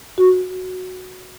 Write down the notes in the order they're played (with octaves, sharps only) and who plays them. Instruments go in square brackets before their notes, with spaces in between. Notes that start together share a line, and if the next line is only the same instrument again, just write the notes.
[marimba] F#4